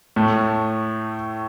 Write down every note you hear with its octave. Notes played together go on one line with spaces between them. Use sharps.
A2 A3